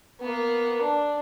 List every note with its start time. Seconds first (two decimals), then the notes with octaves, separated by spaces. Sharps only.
0.21 A#3 B3
0.82 D4